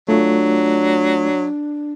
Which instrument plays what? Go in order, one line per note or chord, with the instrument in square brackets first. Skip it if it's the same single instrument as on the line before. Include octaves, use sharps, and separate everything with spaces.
[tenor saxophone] F#3 [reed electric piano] A3 F4 [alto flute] D4